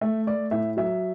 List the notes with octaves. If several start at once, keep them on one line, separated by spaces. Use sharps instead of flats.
A3 E5
A3 D5
A2 E5
F#3 E5